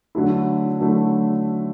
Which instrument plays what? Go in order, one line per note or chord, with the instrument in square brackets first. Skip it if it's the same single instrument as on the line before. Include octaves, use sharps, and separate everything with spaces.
[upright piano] D3 F#3 A3 E4
D3 F#3 A3 E4